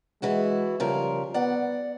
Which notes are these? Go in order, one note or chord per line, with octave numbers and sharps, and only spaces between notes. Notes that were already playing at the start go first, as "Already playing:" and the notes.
E3 G#3 E4 F#4
C#3 F3 G3 A#4
B3 D5 F#5